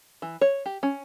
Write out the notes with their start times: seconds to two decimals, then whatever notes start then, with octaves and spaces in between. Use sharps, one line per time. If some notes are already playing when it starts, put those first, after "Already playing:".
0.22 E3
0.41 C#5
0.66 G4
0.83 C#4